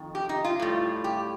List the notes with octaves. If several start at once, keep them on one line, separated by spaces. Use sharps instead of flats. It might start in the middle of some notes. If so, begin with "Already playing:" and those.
Already playing: F2 D#3
G4
D#4
F4
A2 G3
G4